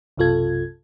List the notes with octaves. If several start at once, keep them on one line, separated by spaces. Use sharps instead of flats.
B1 F#2 C3 F4 A4 G#6